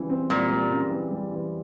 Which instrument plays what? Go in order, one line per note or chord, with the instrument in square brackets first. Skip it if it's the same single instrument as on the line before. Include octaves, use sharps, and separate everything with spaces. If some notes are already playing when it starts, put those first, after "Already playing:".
Already playing: [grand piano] C#3 E3 G3
C4
[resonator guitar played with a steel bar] A#2 [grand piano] G3
[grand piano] G3
C#3
E3
G3
E3